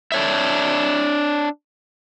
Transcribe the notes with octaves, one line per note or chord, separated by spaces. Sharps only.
D4 C#5 E5